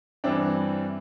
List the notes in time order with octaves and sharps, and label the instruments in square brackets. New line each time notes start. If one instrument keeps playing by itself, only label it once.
[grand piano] G2 E3 C4 D4